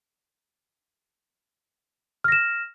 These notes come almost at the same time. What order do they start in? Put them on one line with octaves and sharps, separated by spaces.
F6 A#6 E7